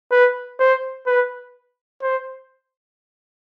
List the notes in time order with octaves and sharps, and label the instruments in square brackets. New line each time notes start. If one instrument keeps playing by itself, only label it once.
[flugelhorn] B4
C5
B4
C5